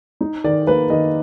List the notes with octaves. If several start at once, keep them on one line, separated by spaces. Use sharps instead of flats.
D#4
D#3 D5
A#3 B4
D#3 D#5